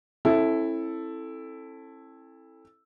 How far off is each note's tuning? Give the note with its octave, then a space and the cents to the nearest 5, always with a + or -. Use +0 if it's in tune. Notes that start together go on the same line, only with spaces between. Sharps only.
C4 +45 E4 +0 A4 +0